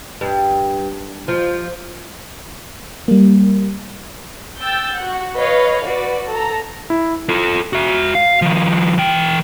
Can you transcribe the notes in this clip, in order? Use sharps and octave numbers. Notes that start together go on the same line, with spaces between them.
G2
F3
G3 A#3
G5 E6 G6 A6
F#4 F#5
B4 C#5 D#5 F5
F#4 B4 D5
A4 A#5
E4
F4 A4
F#4 E5
F5
D#3 F3
E3 G5